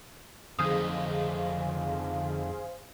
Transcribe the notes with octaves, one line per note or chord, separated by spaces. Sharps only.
F2 D3 D#4 G#4 C5 F5 D#6